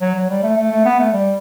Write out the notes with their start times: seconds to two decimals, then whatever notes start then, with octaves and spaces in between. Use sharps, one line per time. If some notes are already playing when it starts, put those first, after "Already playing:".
0.01 F#3
0.15 F#3
0.30 G3
0.43 A3
0.57 A3
0.72 A3
0.85 B3
0.99 A3
1.13 G3